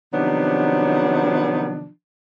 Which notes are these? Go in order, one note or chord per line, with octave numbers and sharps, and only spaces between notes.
C3 D#3 F3 F#3 B3 D4